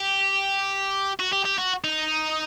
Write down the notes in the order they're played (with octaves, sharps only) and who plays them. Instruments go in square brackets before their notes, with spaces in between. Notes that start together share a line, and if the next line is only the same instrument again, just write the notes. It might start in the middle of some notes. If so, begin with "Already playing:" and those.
Already playing: [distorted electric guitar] G4
F#4
G4
G4
F#4
D#4